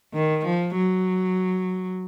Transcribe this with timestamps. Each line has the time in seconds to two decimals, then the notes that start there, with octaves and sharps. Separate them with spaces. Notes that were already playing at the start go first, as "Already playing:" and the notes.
0.14 D#3
0.46 F3
0.77 F#3